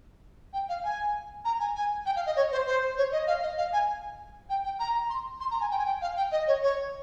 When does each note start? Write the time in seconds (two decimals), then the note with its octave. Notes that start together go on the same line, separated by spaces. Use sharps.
0.53 G5
0.69 F5
0.84 G#5
1.45 A#5
1.60 G#5
1.76 G#5
2.06 G5
2.16 F5
2.26 D#5
2.36 C#5
2.52 C5
2.67 C5
2.97 C#5
3.12 D#5
3.27 F5
3.43 D#5
3.58 F5
3.73 G#5
4.50 G5
4.65 G5
4.80 A#5
5.10 C6
5.40 C6
5.51 A#5
5.61 G#5
5.71 G5
5.78 G#5
5.86 G5
6.02 F5
6.17 G5
6.32 D#5
6.47 C#5
6.63 C#5